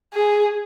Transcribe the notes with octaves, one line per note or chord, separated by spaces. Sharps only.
G#4